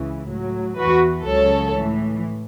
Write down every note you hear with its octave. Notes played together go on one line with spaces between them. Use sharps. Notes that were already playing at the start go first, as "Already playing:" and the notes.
Already playing: C#2 C#3 E3
A2 F#3
E2 E3 F#4 B4
C#2 C#3 F#3 A4 C#5
A2 E3